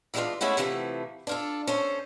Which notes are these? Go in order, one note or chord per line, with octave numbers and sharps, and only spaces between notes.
E3 G3 G#3 C#4 D4 F4
G#3 A3 C#4 E4 F#4
C3 E3 F3 A3 E4
D4 F4 A4
C#4 A4 C5